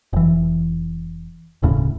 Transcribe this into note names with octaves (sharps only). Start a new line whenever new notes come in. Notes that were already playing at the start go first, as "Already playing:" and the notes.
F1 E3
E1 D2 A2 C#3